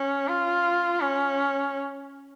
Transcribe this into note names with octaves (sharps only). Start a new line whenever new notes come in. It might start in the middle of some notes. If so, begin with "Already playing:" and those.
Already playing: C#4
F4
C#4